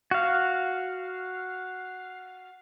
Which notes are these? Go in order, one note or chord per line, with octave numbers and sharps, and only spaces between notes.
F#4 F5